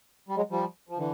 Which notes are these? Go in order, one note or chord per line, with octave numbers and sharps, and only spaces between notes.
G3
F#3 G#3
F3 G3
F3
D3 E3